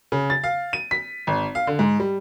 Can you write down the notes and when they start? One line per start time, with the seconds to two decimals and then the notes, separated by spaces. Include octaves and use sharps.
0.12 C#3
0.30 A6
0.44 F5
0.73 D#7
0.91 B6
1.27 G#1
1.55 F5
1.67 D3
1.79 G#2
2.00 G3